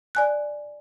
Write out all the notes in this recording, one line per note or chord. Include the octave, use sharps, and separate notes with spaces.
D5 G#5 F#6